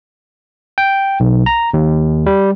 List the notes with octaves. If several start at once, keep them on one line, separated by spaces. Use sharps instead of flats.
G5
B1
A#5
D#2
G3